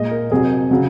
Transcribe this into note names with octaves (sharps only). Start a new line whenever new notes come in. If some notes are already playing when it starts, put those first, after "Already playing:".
Already playing: A#2 G#3 D#5
A#4
F2 C3 F#3 G#4
C#3 F#3